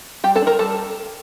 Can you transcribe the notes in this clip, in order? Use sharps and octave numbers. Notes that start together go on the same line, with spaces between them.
G3 G4 G5
A4 A5
D4
A#4 A#5
G3 A4 A5